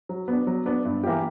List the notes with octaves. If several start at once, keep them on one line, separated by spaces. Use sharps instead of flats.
F#3
B3 D4
F#3
B3 D4
G2
E3 A#3 E4 G4